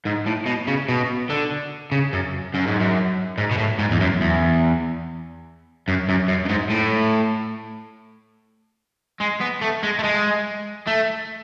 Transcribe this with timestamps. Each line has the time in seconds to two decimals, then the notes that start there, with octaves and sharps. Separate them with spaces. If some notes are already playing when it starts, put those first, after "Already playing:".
0.05 G#2
0.26 A2
0.46 B2
0.67 C#3
0.89 B2
1.30 D3
1.92 C#3
2.13 F#2
2.54 F#2
2.67 G#2
2.80 F#2
3.38 G#2
3.51 B2
3.58 A2
3.79 G#2
3.91 E2
4.00 F#2
4.21 E2
5.88 F#2
6.09 F#2
6.28 F#2
6.46 F#2
6.49 G#2
6.70 A2
9.20 G#3
9.41 B3
9.61 A3
9.83 G#3
9.99 A3
10.04 G#3
10.87 A3